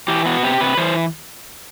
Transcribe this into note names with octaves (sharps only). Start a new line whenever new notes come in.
E3 G4
B3 F#4
C3 G4
C3 B4
E3 C5